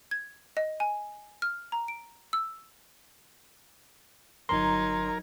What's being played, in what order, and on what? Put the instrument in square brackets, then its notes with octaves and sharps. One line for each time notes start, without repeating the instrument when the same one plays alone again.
[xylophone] G#6
D#5
G#5
F6
A#5
D7
E6
[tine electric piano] G1 A#5 C6 [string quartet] F#3 D#4 G#6 [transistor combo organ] A#4